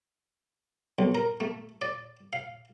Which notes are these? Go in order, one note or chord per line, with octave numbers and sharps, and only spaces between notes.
B1
A#4
A3
D5
F5